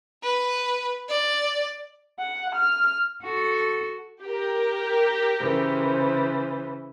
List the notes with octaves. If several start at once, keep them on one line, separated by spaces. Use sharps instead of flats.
B4
D5
F#5
F6
F#4 A4
G4 A#4
C#3 E3 C5